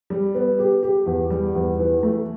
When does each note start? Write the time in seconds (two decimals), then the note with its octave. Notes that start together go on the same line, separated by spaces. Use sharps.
0.10 G3
0.35 B3
0.59 G4
0.83 G4
1.06 E2
1.30 G3
1.55 E2
1.79 E3
2.03 A3